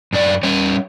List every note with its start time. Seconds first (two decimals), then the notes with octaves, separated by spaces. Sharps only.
0.13 F#2 D4 D5
0.43 G3 C#4 C#5